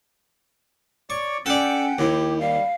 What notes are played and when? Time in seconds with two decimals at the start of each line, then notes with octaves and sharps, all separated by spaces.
1.10 C#5 D5 C#6 D6
1.46 C#4 A4 D5 F#5 G5
1.99 D#2 E4 G4
2.40 G3 F5